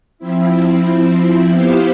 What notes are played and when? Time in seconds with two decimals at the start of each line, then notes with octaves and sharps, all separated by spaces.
0.18 F3 C4 E4
1.49 B3 E4 G4 C5 F5